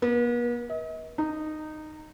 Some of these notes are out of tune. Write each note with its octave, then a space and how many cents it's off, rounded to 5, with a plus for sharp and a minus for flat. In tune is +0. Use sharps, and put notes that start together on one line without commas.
B3 -45
D#5 +40
D#4 -15